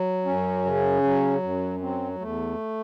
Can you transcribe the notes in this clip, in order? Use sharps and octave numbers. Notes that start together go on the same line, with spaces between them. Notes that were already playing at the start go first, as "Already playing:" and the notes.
Already playing: F#3
F#2 C#4
C#3
F#3
F#2
F#3 C4
E2 A3